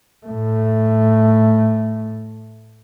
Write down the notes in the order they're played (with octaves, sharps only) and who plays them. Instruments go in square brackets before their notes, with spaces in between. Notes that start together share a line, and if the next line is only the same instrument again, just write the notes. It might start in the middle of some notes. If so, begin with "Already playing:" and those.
[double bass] A2 A3